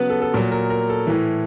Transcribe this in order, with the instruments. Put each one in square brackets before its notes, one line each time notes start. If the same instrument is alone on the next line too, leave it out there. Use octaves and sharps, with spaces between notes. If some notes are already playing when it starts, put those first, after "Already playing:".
Already playing: [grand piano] C#3 F#3 B3 B4
A4
A4
A#2 F#3 A#4
A#4
A#4
A4
A2 E3